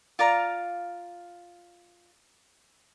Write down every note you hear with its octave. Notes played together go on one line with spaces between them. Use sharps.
F4 D5 F5 A#5